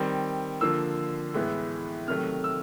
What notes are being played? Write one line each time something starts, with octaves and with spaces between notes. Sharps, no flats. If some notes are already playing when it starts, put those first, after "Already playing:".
Already playing: D#3 G3 C4
D3 F3 A#3 E6
A2 E3 G#3 B3
C3 D#3 F#3 A3 F6
E6